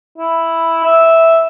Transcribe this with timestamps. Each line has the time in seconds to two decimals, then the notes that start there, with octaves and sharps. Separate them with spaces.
0.18 E4
0.84 E5